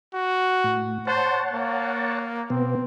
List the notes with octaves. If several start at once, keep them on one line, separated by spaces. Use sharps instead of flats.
F#4
A2
C5 C#5 F#5 A5
A#3
B2 B3 C4